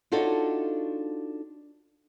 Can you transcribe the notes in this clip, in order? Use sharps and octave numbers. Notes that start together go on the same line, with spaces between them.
D4 D#4 F4 F#4 A4 C#5